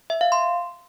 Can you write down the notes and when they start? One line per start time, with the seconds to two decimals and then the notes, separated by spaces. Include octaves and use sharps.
0.10 E5
0.21 F5
0.32 C6